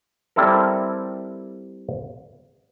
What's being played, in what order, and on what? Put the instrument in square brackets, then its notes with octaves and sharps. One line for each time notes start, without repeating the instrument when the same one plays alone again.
[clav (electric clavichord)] G3 C4 E4 A4 A#4